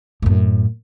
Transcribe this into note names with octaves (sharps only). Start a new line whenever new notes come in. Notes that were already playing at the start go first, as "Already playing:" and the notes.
F#2 A2